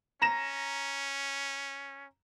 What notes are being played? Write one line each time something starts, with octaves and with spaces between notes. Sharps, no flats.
C#4 A#5 A#6 E7